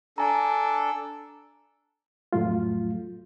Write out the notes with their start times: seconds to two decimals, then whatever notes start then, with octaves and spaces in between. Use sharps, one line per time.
0.18 D4 A4 G#5 A#5
2.33 F2 A2 F#3 A3 F4